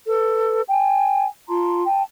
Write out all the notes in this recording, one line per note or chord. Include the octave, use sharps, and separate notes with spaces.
A4 B4
G5 G#5
F4 A5 A#5 C6
G5 A5